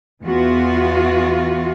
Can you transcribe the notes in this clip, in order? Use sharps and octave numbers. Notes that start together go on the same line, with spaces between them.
E2 E3 B3 F4 F#4